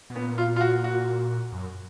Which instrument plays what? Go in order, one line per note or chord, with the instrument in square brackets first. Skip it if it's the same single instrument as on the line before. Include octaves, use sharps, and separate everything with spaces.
[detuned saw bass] B2
[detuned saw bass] A#2 [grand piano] B3
[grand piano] F4
F4
F#4
F#4
[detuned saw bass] F#2